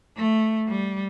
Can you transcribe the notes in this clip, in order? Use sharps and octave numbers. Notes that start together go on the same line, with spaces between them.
A3
G3